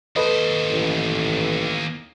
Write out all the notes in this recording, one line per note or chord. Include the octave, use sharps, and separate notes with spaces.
D#2 A4 B4 C5 D#5
A1